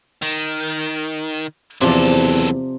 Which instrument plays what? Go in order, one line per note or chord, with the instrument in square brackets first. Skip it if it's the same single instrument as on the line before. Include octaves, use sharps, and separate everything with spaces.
[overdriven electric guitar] D#3
[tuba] E2 [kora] C3 F3 D5 [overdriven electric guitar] F#3 A4